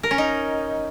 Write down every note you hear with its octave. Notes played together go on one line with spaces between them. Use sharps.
A#4
C#4
D#4